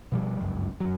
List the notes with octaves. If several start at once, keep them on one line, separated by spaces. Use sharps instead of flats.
B2 F3 G3
G1 C#2 F#2
F#2 F#3